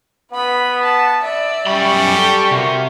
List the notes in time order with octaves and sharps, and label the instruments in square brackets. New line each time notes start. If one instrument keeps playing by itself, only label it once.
[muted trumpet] B3 [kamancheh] B4 B5
[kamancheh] A5
D5 E5
[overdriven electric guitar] F#2 B5 [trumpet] G3 [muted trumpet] C#6
[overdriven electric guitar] G4 [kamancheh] A4
[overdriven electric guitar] C3 [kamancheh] F#4 A#4